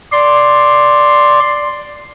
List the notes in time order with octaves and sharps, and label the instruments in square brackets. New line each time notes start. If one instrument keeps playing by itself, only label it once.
[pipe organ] D5 C6